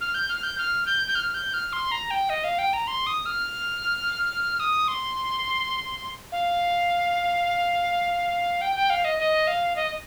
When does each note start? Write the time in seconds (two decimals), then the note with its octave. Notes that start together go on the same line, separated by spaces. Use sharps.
0.01 F6
0.14 G6
0.29 F6
0.43 G6
0.58 F6
0.86 G6
1.08 G6
1.15 F6
1.34 G6
1.54 F6
1.73 C6
1.91 A#5
2.11 G5
2.30 D#5
2.44 F5
2.59 G5
2.73 A#5
2.87 C6
3.06 D#6
3.26 F6
4.60 D#6
4.88 C6
6.32 F5
8.61 G5
8.75 G5
8.90 F5
9.05 D#5
9.19 D#5
9.47 F5
9.76 D#5